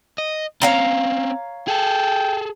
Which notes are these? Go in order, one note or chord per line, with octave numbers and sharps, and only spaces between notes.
D#5
C4 C#4 C#5 F5 A#5
G#4 A4 G5